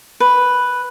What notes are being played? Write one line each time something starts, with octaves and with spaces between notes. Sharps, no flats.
B4